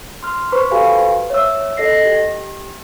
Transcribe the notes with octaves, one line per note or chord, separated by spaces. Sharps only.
C6 F6
B4 C5 B5 C#6
F#4 G4 A4 B4 F5 G#5
C#5 E5 E6
A4 D#5 A#6 C7
G4